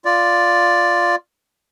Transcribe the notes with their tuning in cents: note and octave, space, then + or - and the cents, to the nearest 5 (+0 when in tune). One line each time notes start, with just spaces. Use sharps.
F4 +0 D5 +0